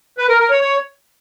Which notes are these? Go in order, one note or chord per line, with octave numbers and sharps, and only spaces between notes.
B4
A#4
A#4
C#5
C#5